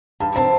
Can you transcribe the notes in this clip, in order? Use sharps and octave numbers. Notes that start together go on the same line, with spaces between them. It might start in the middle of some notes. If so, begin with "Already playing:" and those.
G2 A5
C4 A5